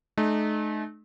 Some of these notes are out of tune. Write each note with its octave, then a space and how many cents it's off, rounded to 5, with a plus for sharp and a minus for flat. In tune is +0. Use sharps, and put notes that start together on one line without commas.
A3 -40 D#4 -35